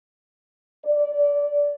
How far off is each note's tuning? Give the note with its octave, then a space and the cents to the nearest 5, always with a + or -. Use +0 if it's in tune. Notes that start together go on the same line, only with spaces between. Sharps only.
D5 -20